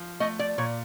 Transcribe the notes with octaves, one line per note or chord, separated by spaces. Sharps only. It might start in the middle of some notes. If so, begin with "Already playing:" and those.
Already playing: F3
A3 D#5
D5
A#2 C#5